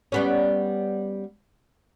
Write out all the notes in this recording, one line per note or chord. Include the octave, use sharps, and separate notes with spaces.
G3 B3 C#4